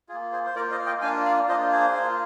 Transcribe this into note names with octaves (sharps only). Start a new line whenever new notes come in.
A#3 F4 G#4
G#4 C5
C5
A#3 F4 A#4 D5
C5 D#5
F5
D#5 G5
A#3 D4 F4 F5 G#5
D5 F5
A#3 D4 F4 C5 D#5
G#4 C5
A#3 F4